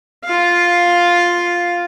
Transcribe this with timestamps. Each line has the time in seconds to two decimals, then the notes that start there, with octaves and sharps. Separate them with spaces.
0.24 F4 F5